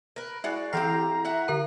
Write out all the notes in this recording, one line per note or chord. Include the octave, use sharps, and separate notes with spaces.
A#4 B4
G#3 E4 F#4 D5
E3 C4 G4 F5 A#5 A#6 C7
F#4 E5 F#5
D3 A#4 A#5